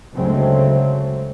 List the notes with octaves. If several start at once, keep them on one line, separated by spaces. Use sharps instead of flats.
D2 C#3 F#3 G#3 A3 C4